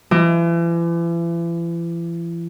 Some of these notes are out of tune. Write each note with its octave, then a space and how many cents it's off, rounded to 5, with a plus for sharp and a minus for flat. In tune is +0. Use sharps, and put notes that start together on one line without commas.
E3 +40